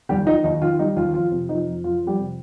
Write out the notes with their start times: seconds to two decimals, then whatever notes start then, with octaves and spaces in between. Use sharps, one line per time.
0.09 D#2 G3 G4
0.26 D#3 D#4
0.44 D#2 D#4
0.62 D#3 F4
0.79 G3 D#4
0.96 D#2 F4
1.14 F2 F4
1.31 C3
1.49 F2 D#4
1.66 F2
1.84 F2 F4
2.02 F2
2.07 G3 G4
2.19 C3